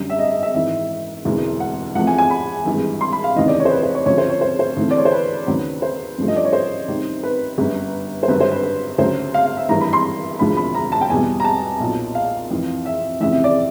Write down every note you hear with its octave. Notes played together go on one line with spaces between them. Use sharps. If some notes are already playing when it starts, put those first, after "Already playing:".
Already playing: F#2 D3 G3
E5
D#5
D#5
E5
G#1 G#2 E3 E5
E1 D2 C3 E3 G#3
F#5
E2 C3 F3 A3 F#5
G#5
G#5
B5
G#1 G2 E3 G#3
C6
B5
F5
F1 D#2 C#3 E3 D#5
D5
C#5
C5
B4
C5
C#5
D2 C#3 F3 C#5
C5
C#5
C5
C5
D2 C3 E3 A3
D5
C#5
C5
B4
D#2 C#3 F#3
C5
A1 G2 D3 F3 A3
D#5
D5
C#5
C5
C2 C3 D#3
B4
G1 F#2 D3
C5
G#1 G2 D3 F#3 B4
C5
B4
B4
D2 C#3 F#3 C5
F5
F5
E5
G#1 G2 E3 A#5
B5
C6
E1 D2 D3 F3 G#3 B5
B5
A#5
A5
G5
E2 B2 G3 G#5
A#5
A5
B1 A#2 F#3
F5
F2 C3 E3
E5
F1 F2 C#3 E3 E5
E5
D5